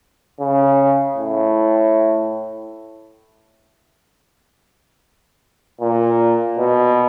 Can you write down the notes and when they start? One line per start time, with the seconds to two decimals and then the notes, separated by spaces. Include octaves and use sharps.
0.40 C#3
1.17 A2
5.81 A#2
6.58 B2